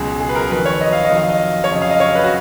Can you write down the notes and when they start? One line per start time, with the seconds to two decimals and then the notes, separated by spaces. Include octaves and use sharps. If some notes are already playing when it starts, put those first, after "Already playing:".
Already playing: C#2 B2 F#3 G#4
0.20 G#4
0.29 B4
0.35 A#4
0.51 F2 D#3 F#3 B4
0.65 C#5
0.81 D#5
0.92 F5
1.05 D#5
1.10 F2 D#3 F#3
1.17 F5
1.29 D#5
1.64 C#5
1.70 F2 C#3 F#3 D#5
1.82 F5
1.90 D#5
2.00 C#5
2.15 B4
2.24 F#4